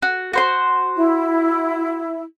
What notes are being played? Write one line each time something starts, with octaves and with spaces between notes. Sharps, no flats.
F#4
F#4 C5 C6
E4